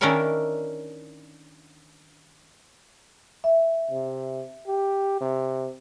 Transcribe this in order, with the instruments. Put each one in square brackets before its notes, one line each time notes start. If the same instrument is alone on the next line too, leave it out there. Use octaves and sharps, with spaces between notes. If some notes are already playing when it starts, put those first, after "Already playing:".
[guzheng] D#3 C#4 D4 E4 A#4 C#5
[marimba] E5
[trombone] C3
G4
C3